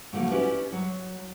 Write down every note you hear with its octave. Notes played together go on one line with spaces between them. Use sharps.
A2 D3 F3 F#3 A3 A#3
C#4 E4 G4 B4 D5
F#3